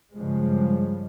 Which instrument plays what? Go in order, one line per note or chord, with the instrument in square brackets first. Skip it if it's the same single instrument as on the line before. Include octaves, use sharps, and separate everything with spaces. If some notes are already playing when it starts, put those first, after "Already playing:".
[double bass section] G2 C#3 F3 G3 G#3